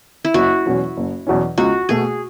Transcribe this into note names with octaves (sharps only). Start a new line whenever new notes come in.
E4
F#1 F#4
E2 B2 F#3 C#4
F#1
E2 B2 F#3 C#4
C#2 F#4
B2 A3 G#4